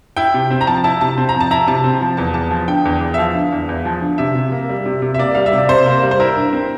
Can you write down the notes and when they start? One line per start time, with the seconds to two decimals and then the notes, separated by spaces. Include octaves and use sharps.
0.17 E4 G5
0.34 C3
0.51 C4
0.61 A#5
0.67 F3 A5
0.84 E4 A5
1.01 C3 A5
1.18 C4
1.29 A#5
1.35 F3
1.40 A5
1.51 E4 A#5
1.67 C3 A5
1.84 C4
2.01 F3
2.17 E2 A5
2.34 E2 A5
2.51 F3
2.68 D3 G5
2.85 E2
3.01 E2
3.14 E5
3.18 F3 F5
3.34 D3
3.52 E2
3.69 E2
3.85 F3
4.01 D3
4.18 C3 E5
4.35 C3
4.52 A#3
4.69 G3
4.86 C3
5.02 C3
5.14 E5
5.19 A#3 D5
5.35 G3 F5
5.46 E5
5.53 C3 D5
5.69 C3 C5
5.86 A#3
6.03 G3
6.11 C5
6.20 E4 A#4
6.37 G2
6.53 C4